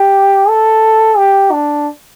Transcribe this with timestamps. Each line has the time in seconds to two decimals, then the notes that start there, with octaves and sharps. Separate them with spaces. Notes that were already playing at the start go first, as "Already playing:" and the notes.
Already playing: G4
0.49 A4
1.17 G4
1.52 D4